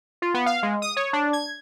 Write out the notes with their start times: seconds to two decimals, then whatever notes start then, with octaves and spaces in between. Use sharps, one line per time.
0.22 F4
0.34 B3
0.46 F5
0.63 G#3
0.82 D#6
0.97 C#5
1.13 D4
1.33 G#6